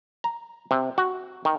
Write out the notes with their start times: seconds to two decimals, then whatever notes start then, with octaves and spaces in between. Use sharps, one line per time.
0.24 A#5
0.71 C3
0.98 F#4
1.45 D#3